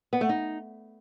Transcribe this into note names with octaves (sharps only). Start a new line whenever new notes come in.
B3
A3
D#4